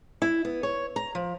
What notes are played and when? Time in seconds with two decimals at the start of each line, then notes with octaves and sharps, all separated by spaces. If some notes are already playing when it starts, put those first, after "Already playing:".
0.22 E4
0.45 B3
0.63 C#5
0.96 A#5
1.15 F3